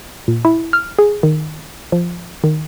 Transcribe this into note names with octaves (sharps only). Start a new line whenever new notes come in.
A#2
E4
F6
G#4
D#3
F3
D#3